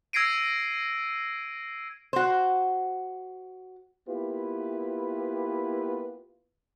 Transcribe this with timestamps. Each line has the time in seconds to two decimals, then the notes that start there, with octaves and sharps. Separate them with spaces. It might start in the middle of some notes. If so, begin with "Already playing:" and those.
0.13 E6 G#6 A#6 C7 D7 D#7
2.13 F#4 C5
4.08 A#3 B3 E4 F4 G4 B4